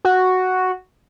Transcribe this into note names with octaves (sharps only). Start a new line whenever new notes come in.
F#4